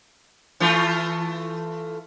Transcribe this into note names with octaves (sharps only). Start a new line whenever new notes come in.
E3 A3 F4